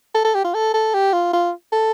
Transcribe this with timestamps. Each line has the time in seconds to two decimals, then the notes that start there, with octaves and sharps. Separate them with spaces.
0.15 A4
0.25 A4
0.34 G4
0.44 F4
0.54 A4
0.74 A4
0.94 G4
1.13 F4
1.33 F4
1.72 A4